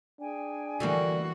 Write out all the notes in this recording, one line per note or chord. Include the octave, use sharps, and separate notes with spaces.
D4 G#4 G5 G#5
D3 E3 G3 A#3 F#4